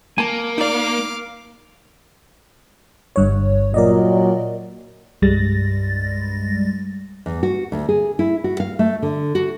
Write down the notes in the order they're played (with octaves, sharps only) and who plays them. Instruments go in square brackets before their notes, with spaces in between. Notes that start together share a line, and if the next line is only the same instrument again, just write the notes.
[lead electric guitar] A#3 [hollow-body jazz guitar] G#5 A5
[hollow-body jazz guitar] D#4 D5 [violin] F5 D6
[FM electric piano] G1 G2 C#5
[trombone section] A#2 F#3 [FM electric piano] A#4 D5 D#5
[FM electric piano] C2 G2 G3 G#3 A6 A#6
[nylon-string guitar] E2
F#4
D2
G#4
E4
F#4
F5
A3
D3
F#4